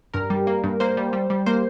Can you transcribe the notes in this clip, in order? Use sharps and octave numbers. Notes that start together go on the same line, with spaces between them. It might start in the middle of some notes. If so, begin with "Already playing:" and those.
G2 A#4
G3
A#3
G2
A#3 C5
G3
G3
G3
A#3 C5